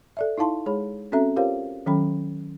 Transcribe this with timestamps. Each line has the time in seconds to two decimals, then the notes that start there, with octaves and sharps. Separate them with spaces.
0.17 A4 D5 E5
0.38 D#4 E4 F5 A5 C6
0.66 G#3 G#4 C#5 B5
1.12 C4 C#4 F#4 A4 E5 A#5
1.36 F4 G4 A#4 C5 C#5 F5
1.86 D#3 F#3 C#4 A4 G5 B5